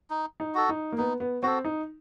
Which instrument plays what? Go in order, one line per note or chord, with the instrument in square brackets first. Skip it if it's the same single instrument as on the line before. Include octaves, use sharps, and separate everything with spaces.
[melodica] D#4
[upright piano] D#4
[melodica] F#4 A4
[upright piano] D#4
A#3
[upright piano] B3 [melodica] D#4
[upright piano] B3
[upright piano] C4 [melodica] F#4 A4
[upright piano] D#4